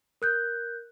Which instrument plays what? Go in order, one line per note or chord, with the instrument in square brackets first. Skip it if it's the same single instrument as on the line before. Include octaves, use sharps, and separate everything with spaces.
[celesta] A#4 F#6 G6